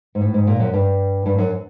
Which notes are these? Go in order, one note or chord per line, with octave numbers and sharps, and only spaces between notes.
G#2
A2
G#2
A#2
F#2
G2
G2
F#2